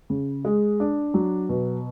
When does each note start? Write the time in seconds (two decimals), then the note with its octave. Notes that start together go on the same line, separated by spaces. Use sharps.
0.10 C#3
0.45 G#3
0.80 D4
1.14 F#3
1.49 B2